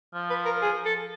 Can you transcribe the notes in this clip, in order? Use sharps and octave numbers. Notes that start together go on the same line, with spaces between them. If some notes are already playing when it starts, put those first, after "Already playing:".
F3
B4
A#4
G#4
A4